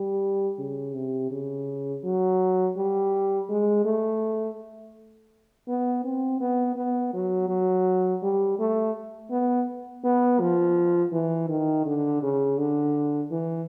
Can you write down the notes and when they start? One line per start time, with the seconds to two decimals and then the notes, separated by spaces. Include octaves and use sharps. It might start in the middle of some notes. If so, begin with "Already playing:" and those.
Already playing: G3
0.59 C#3
0.94 C3
1.31 C#3
2.04 F#3
2.77 G3
3.49 G#3
3.85 A3
5.68 B3
6.04 C4
6.40 B3
6.76 B3
7.13 F#3
7.49 F#3
8.22 G3
8.59 A3
9.31 B3
10.04 B3
10.40 F3
11.12 E3
11.49 D#3
11.85 D3
12.22 C#3
12.58 D3
13.31 E3